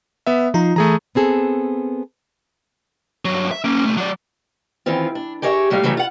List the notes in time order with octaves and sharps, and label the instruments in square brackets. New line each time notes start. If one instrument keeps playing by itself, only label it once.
[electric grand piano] B3 E5
[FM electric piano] F3 F4 A#5 [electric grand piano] D#4
[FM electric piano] E3 [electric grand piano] A3 G#4 A#5
[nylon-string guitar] B3 C4 G#4 A4
[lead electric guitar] G2 F#3
E5
A#3 C#4
C2 A3
F#3 D5
[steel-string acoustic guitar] D#3 E3 C4 F4
D4
G4 G#4 A#4 C#5 D5 E5
A2 F#3 G3 A3 F5
C#3 E3 F#3 G3 A3
F4 F#5